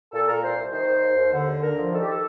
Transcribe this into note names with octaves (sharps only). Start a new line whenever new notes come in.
A#2 A4
A#2 A#4
C2 C5
C2
D#3 C5
D#3
D#2
D#2
D3
D#2
D3 A#4
F3
D#3 A4
G4
A4